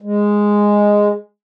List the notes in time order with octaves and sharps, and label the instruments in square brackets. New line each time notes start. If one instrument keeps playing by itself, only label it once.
[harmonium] G#3